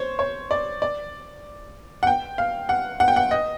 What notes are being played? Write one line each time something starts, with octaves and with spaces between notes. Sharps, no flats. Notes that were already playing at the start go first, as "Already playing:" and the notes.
Already playing: C5 C#5
C#5
D5
D5
F#5
G5
F5
F#5
F#5
G5
F#5
D#5